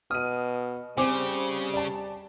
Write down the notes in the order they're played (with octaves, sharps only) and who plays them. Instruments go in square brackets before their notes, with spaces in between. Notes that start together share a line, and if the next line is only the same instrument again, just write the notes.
[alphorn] B2 [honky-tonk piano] D#6 D#7 [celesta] F6
[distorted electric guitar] C#3 [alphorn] G3 [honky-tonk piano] C4 C5 [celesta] G#5 D6
[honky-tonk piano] D5 A5